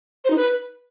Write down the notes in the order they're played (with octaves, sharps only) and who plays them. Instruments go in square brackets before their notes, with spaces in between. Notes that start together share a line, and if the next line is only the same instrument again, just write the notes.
[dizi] C5
D#4
B4